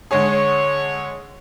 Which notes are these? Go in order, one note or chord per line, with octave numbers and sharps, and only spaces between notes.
D3 G#3 G#4 C#5